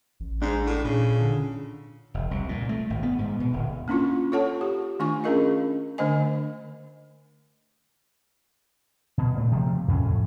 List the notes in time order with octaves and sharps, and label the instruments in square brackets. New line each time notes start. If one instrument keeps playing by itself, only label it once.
[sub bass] A1
[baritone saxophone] G#2 [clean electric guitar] D4
[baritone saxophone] A2
[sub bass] A#2 [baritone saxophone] C#3
[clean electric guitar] D3
[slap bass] F1
C2
A#2
A3
G#1
B3
G#2
B2
D1
[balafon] A#3 C#4 D4 E4 F4
F4 A4 C#5 F#5 A5
G4
D#3 A3 D4 F4 G#5 C#6
C#4 D4 G#4 A#4 D#5 F5
D3 A3 D4 C5 D#5 G#5
[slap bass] B2
A#2 A3
C3 F3 A3
F2 A2 C#4